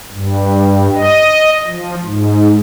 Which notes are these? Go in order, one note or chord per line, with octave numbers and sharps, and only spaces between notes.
G2
D#5
F3
G#2